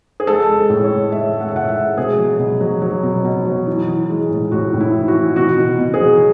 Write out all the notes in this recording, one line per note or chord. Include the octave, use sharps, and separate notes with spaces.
G#4
G#3 A4
G#3
A2
C#5
G#3
G#3 E5
G#3
F#5
E5
A2 F#5
E5
G#3
B2 G#4
F#3
B2
F#3
F#3
B2
B2
F#3
E3
E3
G#3
A2
A2 F#4
A2
E4
E3
F#4
E3
B2 F#4
B2
B2
G#4
F#3